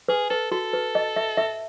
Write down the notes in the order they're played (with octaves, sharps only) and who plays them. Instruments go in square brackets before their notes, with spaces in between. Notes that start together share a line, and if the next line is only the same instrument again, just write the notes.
[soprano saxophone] G#4 [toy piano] B4
[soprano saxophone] A4 [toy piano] B4
[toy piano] F#4 [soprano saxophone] A4
[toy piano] B4
D#5
E5
E5